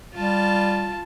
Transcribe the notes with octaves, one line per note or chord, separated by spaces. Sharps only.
G3 F4 A5